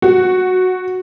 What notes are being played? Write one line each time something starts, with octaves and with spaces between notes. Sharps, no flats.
F#4